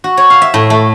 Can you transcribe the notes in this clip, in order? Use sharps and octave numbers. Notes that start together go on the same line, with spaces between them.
F#4
C#5
F5
E5
A2
A3